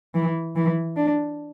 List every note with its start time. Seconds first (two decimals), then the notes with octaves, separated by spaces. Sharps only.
0.15 E3
0.56 E3
0.96 D4